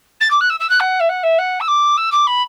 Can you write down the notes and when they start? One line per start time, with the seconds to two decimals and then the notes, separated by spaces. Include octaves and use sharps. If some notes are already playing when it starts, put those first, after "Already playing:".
0.20 A6
0.30 D6
0.40 F#6
0.49 E6
0.60 E6
0.69 F#6
0.80 F#5
1.00 E5
1.09 F#5
1.23 E5
1.38 F#5
1.60 E6
1.67 D6
1.97 E6
2.12 D6
2.27 B5